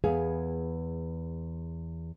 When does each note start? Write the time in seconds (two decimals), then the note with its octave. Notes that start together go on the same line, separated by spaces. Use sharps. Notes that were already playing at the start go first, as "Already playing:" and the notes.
0.04 E2 B3 G#4 F5